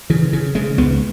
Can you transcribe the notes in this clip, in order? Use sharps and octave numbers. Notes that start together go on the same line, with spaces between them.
C#3 E3
C#3
C#3 G#3
C#2 B3